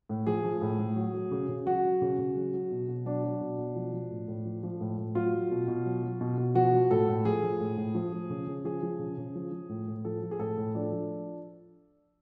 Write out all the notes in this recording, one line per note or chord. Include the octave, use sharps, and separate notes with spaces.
A2
F3 G#4
F3
A2
A2
F#3
F#3
C#3
C#3
F#3 F#4
F#3
C#3
C#3
F#3
F#3
B2
B2
F#3 D4
F#3
B2
B2
F3
F3
A2
A2
F3
F3
A2
A2
F#3 F4
F#3
B2
B2
F#3
F#3
B2
B2
F3 F#4
F3
A2 A4
A2
F3 G#4
F3
A2
A2
F3
F3
C#3
C#3
F3 G#4
F3
C#3
C#3
F3
F3
A2
A2
F3 A4
F3
G#4
A2 A4
A2
F3 D4
F3